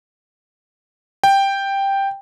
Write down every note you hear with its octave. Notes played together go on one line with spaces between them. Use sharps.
G5